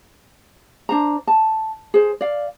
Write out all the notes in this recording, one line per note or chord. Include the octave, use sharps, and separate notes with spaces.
D4 C5 A#5
A5
G#4 C5
D5 F5